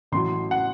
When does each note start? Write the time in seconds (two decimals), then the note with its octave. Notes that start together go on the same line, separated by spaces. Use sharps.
0.12 A1 A2 F#3 C6
0.51 F#5